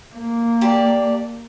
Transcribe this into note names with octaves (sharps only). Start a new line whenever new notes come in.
A#3
G4 D5 A5